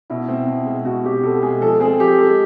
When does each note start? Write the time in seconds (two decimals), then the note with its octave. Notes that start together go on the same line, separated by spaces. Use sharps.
0.10 B2 E4
0.28 C4
0.47 B2
0.66 G#3
0.85 B2 F#4
1.04 C4 G4
1.23 B2 A4
1.42 G#3 G#4
1.61 F3 A4
1.80 C4 G#4
2.00 F3 G4
2.18 G#3 A4